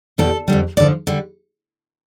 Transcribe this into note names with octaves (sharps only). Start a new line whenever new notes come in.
E2 B2 G3 A4
F2 D3 G3
G2 D3 F3 D5
D3 G3